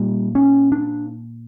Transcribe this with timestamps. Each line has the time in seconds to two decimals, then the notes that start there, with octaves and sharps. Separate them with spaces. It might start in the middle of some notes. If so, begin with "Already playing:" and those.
Already playing: A#2 G3
0.35 C#4
0.72 D4